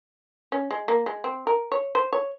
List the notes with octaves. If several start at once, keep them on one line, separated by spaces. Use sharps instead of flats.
C#4
G#3
A#3
G#3
C4
A#4
C#5
C5
C#5